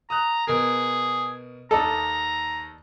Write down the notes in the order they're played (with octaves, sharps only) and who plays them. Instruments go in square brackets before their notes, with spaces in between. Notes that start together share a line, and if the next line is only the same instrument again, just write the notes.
[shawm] A#5 [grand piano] D#6 F#6
[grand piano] B2 A#4 [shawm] G#4
[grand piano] D#2 D5 D#5 [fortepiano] A4 [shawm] A#5